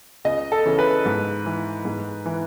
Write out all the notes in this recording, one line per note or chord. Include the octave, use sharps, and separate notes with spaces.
C#2 D#5
A4
C#3 E3
B4
G#2
E3
G#2
E3